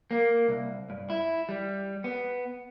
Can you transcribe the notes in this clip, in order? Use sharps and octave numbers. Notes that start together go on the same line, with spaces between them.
A#3
C2
G2
E4
G3
B3